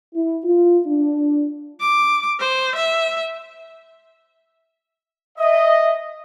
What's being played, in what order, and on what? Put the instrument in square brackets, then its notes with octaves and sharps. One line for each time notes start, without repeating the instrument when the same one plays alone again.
[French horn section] E4
F4
D4
[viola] D6
C5
E5
[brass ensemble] D#5 [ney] E5